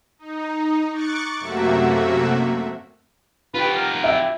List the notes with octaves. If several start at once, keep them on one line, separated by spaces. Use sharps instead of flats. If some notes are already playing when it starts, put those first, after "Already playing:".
D#4
C#6 D6 F#6 A6 C#7
F#2 C3 A3 A#3 F#4 E5
F4 G4 B4
A#4
E4 E5